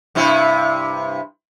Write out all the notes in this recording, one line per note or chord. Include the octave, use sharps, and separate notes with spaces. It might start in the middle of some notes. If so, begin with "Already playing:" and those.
G2 C3 E4